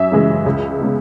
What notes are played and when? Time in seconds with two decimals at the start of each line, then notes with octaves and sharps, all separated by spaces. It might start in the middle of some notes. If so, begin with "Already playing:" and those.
Already playing: F#2 E5
0.12 C#3 E3 G#3
0.46 C#2
0.80 C#3 G#3 B3